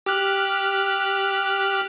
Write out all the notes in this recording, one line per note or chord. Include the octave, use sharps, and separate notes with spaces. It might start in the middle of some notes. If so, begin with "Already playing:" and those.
G4 F6 F#6